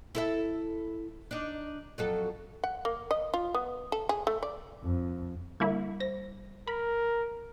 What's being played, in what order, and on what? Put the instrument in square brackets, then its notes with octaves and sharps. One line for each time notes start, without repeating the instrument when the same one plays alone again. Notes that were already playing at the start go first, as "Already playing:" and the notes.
[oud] E4 A4 E5
D4 D#4
F2 F#3 A4
[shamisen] F#5
A#3
D#5
F4
B3
A4
G#4
A3
D5
[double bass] F2
[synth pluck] D3 A#3 E4 [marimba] G3
[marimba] C5 [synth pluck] A#6
[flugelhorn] A#4 [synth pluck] B5